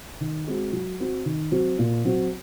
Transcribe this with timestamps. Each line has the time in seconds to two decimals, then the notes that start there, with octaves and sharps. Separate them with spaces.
0.20 D#3
0.47 G#3 C4 F#4
0.73 F#3
1.00 C4 F#4
1.25 D#3
1.51 F#3 C4 F#4
1.79 A#2
2.05 F#3 C4 F#4